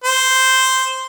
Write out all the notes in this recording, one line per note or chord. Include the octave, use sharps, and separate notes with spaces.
C5